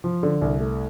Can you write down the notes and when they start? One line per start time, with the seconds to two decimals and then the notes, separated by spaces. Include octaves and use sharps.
0.04 F3
0.23 D3
0.41 C2
0.60 A3